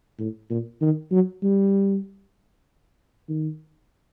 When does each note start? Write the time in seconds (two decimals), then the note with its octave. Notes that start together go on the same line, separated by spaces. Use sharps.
0.19 A2
0.50 A#2
0.81 D#3
1.12 F#3
1.43 G3
3.29 D#3